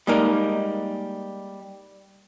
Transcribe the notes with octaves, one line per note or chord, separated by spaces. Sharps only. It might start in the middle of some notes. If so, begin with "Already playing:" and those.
G3 G#3 A#3 D#4 A#4 D#5